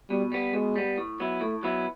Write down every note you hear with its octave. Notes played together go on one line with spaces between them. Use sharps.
B2 G3
G3 B3
B2 G#3
G3 B3
A2
F#3 B3 E4
A2 A3
F#3 B3 E4